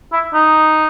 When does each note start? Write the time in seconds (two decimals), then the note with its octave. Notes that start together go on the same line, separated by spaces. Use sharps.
0.13 E4
0.34 D#4